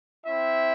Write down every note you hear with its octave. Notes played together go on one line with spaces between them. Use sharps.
C4 E4 E5